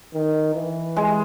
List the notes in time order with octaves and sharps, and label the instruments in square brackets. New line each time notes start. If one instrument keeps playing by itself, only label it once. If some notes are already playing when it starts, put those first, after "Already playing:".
[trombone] D#3
E3
[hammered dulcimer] G#3